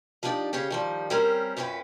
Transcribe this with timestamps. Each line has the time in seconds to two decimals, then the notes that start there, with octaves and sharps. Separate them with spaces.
0.23 F3 D4 D#4 G4 D5 D#5
0.53 C#3 C#4 G4 G#4 C#5
0.70 D#3 F3 G3
1.10 G3 C4 C#4 G4 A#4
1.57 F#2 A#2 C#4 A#4 B4 G5